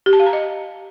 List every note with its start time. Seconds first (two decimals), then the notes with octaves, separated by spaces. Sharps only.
0.06 G4
0.13 A5
0.20 F5
0.26 A#5
0.33 D#5